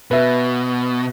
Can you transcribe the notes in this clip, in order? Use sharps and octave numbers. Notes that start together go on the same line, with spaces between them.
B2 B4 E5